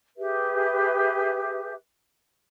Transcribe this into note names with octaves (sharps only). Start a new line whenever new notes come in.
G4 G#4 B4 E5